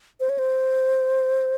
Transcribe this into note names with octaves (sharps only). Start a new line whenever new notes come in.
C5
C#5
C5